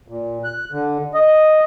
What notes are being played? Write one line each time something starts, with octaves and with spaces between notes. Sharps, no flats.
A#2
F#6
D3
D#5